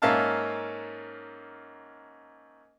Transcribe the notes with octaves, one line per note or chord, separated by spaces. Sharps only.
G#2 A#3 C#4 E5 F5 A5